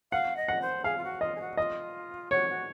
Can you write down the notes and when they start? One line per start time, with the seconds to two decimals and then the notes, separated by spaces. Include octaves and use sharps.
0.11 F5 F#5
0.36 D#5
0.48 F#5
0.61 C5
0.84 G#4 F5
0.97 F4
1.03 F#4
1.21 F4 D#5
1.35 G#4
1.40 F#4
1.57 F4 D#5
2.31 F#4 C#5
2.49 F#4